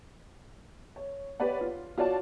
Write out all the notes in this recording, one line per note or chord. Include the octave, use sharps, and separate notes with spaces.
C#5
G4 B4 C#5 D5 F#5
F4
F4 F#4 C#5 D5 F#5 A5